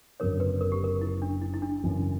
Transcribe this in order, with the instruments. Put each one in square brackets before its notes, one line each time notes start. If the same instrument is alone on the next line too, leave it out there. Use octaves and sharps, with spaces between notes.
[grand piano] F#1 F#2 D3 F#3 B3 [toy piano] A#4 C#5
[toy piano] B4
A#4
G4
A#4
E4
D4
E4
E4
D4
[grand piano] F#1 F#2 E3